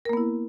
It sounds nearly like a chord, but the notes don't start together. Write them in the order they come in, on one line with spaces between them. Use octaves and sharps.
A#4 A#3 B3 E4